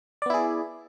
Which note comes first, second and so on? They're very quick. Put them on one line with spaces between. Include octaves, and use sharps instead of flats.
D5 B3 E4 G#4